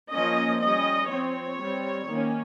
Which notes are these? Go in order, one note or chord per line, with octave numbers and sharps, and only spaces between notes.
F3 A#3 C#4 D#5
G3 C#4 D#5
F3 C4 C#5
G3 C4
D#3 A#3 C#4